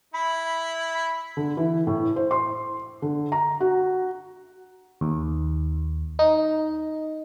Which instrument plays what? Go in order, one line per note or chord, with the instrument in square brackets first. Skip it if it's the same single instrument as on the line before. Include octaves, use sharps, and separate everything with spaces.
[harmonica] E4 [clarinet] B5
[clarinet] B5
[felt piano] D3
E3
A2
C5
C6
D3
A#5
F#4
[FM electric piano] D#2
D#4